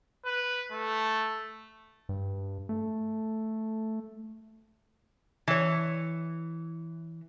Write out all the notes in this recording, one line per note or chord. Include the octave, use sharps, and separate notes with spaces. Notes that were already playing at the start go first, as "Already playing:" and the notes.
B4
A3
G2
A3
E3 C#5